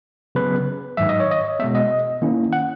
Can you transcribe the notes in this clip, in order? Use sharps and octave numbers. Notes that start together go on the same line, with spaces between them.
C#3 F#3 B3 B4
G#2 D#3 F#3 E5
D#5
C#5
D#5
B2 G#3 B3 E5
D#5
D#3 A#3 C#4 E4
F#5